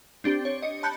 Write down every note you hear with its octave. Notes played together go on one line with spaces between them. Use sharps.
C4 D4 G4
C#5
D#5 C#7
A5 B5 F#6 G6 C#7